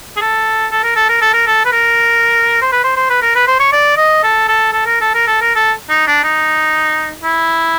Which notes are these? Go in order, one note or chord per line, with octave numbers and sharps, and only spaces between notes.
G#4
A4
A4
A#4
A4
A#4
A4
A#4
A4
B4
A#4
C5
B4
C5
C5
B4
A#4
B4
C5
C#5
D5
D#5
A4
A4
A4
A#4
A4
A#4
A4
A#4
A4
D#4
D4
D#4
E4